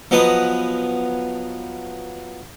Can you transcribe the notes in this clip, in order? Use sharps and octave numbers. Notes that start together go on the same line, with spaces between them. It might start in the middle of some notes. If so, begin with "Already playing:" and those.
F3 F#3 B3 D#5